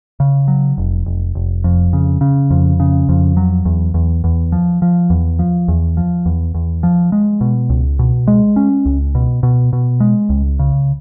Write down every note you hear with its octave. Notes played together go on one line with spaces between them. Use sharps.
C#3
F#3
F1
F1
F1
F2
C#3
C#3
F2
C#3
F2
F#3
E2
E2
E2
F3
F3
E2
F3
E2
F3
E2
E2
F3
G#3
B2
C#2
B2
G#3
C#4
C#2
B2
B2
B2
G#3
C#2
C#3